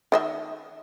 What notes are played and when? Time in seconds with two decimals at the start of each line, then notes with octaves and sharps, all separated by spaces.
0.12 D#3 D#5 E5